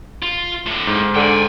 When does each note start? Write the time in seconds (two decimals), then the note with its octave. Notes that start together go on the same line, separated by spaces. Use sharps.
0.23 F4
0.67 A2 D3
0.87 G#2
1.16 D3 G5 G#5